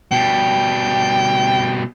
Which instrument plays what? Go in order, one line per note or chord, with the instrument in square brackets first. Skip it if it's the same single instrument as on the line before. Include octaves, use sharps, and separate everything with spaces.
[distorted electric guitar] B2 G3 [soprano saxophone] G5